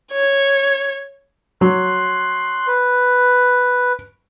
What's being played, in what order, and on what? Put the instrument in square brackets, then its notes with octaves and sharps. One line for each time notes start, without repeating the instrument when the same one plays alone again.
[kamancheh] C#5
[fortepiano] F#3 [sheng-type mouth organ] C6 F#6
[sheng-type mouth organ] B4